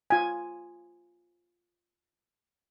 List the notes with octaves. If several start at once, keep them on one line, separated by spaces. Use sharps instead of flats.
F4 G#5